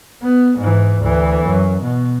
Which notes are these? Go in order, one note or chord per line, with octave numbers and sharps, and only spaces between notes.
B3
G#2 E3
D2 E3
F#2
B2